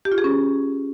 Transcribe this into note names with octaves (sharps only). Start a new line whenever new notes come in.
G4
F4
G#4
C#4